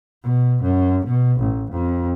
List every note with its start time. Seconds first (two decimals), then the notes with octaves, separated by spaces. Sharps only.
0.23 B2
0.62 F#2
1.05 B2
1.40 A1
1.71 F2